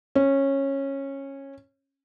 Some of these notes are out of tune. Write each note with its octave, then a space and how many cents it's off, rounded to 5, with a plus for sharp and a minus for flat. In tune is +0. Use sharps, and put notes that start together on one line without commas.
C#4 -15